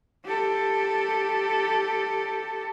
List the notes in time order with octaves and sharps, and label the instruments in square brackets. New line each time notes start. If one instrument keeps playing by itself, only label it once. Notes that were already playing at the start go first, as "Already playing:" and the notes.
[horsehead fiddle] G4 A4